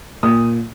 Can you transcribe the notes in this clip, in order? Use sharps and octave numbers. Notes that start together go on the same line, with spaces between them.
A#2 D#6